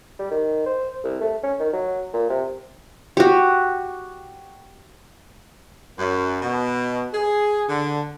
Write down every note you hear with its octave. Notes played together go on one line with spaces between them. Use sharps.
G3
D#3
C5
C2
A3
C#4
D#3
F#3
A#2
C3
F#4 G4
F#2
B2
G#4
D3